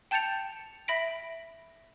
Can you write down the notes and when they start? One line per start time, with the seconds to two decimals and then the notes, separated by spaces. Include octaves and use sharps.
0.11 G5 A5 G6 A6 C#7 F7
0.88 E5 B5 A#6 B6 D7